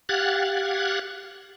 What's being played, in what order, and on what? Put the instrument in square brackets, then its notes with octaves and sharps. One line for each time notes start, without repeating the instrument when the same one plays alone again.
[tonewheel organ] G4 F5 F#5 F#6 G#6 A6